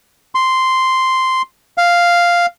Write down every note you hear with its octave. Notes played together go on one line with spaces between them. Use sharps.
C6
F5